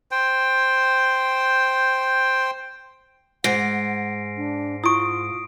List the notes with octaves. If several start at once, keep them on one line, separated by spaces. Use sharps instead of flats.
C5 G5
G#2 F#5 A#6 C7 D7
D4
E4 F4 C#6 D#6 D7